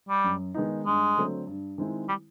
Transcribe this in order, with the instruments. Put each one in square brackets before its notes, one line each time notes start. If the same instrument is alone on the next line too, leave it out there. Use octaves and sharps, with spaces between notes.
[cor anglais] G3
[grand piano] F#2
D#3 G#3 B3 D#4
[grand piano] G2 [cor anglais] G#3
[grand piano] D3 F#3 A3 C4
G2
D#3 G#3 C4 E4
[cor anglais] G3